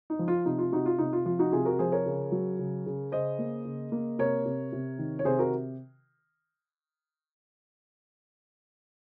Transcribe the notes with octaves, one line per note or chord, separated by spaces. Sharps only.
D#4
F3
F4
C3 D#4
F4
C3 D#4 F#4
F4
C3 D#4
F4
F3 F4
D#4 F#4
C3 F4 G#4
F#4 A#4
F3 G#4 C5
A#4 C#5
C#3
F#3
C#3
C#3
C#3 C5 D#5
A#3
C#3
A#3
C3 A#4 C#5
C3
C3
D#3
C#5
C3 G#4 C5
F#4 A#4